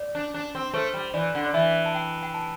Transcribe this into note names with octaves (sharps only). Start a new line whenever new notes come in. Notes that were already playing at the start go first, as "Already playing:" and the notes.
Already playing: D5
D4
D4
C4
A3 C5
G3
E3 D5
D3
D5
E3 E5
A5
G5
G5
A5